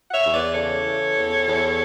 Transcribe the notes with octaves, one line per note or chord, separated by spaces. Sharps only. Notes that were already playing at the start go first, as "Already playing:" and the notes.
F#5
C#5 E5
E2
B4 D5
C#3 A4 C#5
E3
E2
E2